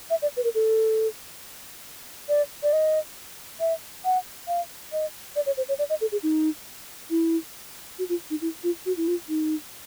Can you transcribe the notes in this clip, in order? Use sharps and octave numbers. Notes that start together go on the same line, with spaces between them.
E5
D5
B4
A#4
A4
D5
D5
D#5
E5
F#5
F5
D#5
D5
C#5
C5
C#5
D5
D#5
A4
G#4
D#4
E4
F#4
F4
D#4
E4
F4
F#4
E4
F4
D#4